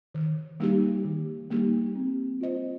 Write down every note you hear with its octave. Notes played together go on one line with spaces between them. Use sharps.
D#3
G3 A#3 D#4 G4
D#3
G3 A#3 D#4 G4
C4
F4 C5 D#5